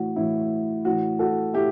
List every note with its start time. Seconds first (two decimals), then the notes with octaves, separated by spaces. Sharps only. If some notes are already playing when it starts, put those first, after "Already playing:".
Already playing: A2 E3 F#4
0.16 A2 E3 E4
0.85 A2 E3 F#4
1.19 F#4 A4
1.54 A2 E4 G4